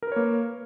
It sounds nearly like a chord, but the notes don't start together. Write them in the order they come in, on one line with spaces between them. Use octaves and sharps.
A#4 B4 C#5 A#3